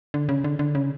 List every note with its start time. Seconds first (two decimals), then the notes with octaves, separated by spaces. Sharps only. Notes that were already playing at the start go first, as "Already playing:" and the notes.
0.14 D3
0.29 C#3
0.44 D3
0.59 D3
0.75 C#3